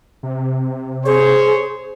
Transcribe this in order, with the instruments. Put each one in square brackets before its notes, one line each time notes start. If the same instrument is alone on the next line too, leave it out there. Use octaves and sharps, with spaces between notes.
[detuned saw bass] C3
[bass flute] G#4 [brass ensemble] C5 C#5